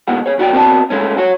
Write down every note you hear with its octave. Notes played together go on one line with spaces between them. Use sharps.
D#2 B2 G#3 F#5
G#4 C#5
D#2 F#4 D5 G5
C4 F#4 D5 D#5 A5
G#3 A3 C#4
F#4 C#5